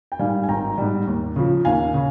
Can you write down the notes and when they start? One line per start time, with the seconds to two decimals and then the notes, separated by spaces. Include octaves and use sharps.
0.12 G5
0.19 G#2 G3 F5 G#5
0.43 G#5
0.48 G#1 G5 A#5
0.78 G#2 G3
1.07 D#2
1.36 C#3 F3
1.65 D#2 F5 G#5
1.94 C#3